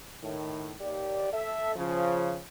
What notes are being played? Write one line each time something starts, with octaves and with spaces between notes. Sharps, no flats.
A2 D#3
D#2 G4 D5
A4 E5
C#3 F3